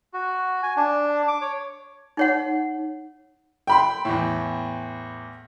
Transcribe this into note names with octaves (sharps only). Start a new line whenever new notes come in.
F#4
G#5
D4
D6
C#5
D#4 C#5 F#5
G5 B5 C6
E2 A2